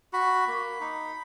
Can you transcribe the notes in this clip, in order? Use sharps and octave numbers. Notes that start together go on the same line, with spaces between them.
F#4 B5
A#3
D#4